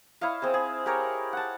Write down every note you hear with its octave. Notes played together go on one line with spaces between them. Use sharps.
E4 C#5 D#5 F5
C4 G#4 C5
G#4
G4 G#4 A#4 C#5
F#5 A5